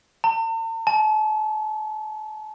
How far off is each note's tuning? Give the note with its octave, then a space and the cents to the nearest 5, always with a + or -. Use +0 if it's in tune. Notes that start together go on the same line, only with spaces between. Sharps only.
A5 +45
A5 -40